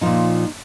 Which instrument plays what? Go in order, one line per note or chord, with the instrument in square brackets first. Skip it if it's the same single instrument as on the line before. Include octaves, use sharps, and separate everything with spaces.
[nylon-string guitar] A#2 F3 D#4